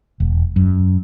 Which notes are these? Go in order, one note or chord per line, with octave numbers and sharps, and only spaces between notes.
E1
F#2